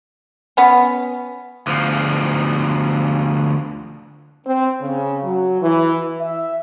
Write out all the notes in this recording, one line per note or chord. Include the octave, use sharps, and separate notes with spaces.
B3 C#4
D2 F3
C4
C#3
F#3
E3
E5